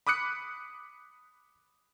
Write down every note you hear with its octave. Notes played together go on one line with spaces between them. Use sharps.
B5 D6 D#6 F#6 C#7